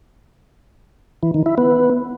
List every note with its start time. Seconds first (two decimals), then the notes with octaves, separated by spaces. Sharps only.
1.23 E3
1.34 D#3
1.46 E4
1.58 B3